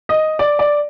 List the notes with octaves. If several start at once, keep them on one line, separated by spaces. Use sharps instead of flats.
D#5
D5
D5